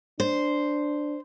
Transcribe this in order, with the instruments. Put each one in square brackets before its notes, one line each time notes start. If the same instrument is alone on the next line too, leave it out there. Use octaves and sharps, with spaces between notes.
[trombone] D4 [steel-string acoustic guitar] C5